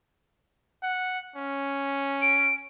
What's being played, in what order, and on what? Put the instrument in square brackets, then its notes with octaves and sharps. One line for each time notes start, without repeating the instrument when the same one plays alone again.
[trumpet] F#5
C#4
[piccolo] D7